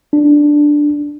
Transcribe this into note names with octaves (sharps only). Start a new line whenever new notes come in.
D4